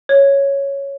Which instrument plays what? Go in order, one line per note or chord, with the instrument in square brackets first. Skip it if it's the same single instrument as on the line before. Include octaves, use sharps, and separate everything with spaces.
[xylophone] C#5